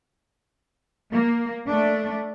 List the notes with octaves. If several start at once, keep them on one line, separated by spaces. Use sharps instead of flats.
A#3
A3 D4